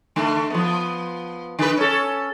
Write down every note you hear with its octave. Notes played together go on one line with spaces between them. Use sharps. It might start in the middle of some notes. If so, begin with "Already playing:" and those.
D3 A3
F3 B3
D3 B4
C#4 A4